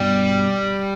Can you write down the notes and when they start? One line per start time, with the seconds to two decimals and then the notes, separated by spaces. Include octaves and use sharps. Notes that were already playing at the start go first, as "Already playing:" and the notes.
Already playing: G2 B2 G3